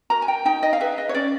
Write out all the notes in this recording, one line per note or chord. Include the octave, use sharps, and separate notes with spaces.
F#4 A#4 A#5
G#5
G5
D#4 G5
D#5
F5
G#4 B4 E5
D#5
C#5
C#4 D5